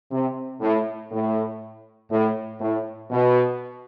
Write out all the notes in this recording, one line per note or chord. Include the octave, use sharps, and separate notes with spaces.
C3
A2
A2
A2
A2
B2